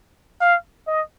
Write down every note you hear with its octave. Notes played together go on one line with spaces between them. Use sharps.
F5
D#5